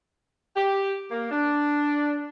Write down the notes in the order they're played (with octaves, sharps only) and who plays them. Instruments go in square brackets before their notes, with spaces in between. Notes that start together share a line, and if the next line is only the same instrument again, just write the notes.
[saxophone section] G4
A#3
D4